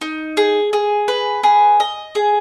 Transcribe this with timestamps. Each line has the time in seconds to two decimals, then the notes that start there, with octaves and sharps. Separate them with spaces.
0.01 D#4
0.37 G#4
0.73 G#4
1.08 B4
1.43 G#4
1.80 D#5
2.15 G#4